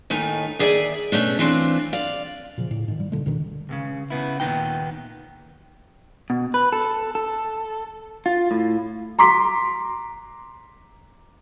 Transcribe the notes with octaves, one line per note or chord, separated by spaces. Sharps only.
D#2 A2 A3 D#4 G#5
D#2 G#4 D5 E5 G5 G#5
B2 A3 C#4 D4
E3 C4 D4 F4
D5 F5
A#2 C#3 F3
A2
G#2 D#3
G3
G2 A#2 D3 G#3
C#2 B2 D3 D#3
C#2 A#2 C#3
C#3 B3 E4
D#2 A#2 F3 B3 D#4 G5
B2
B4
A4
A4
F4
A2
A#5 C6 D6 B6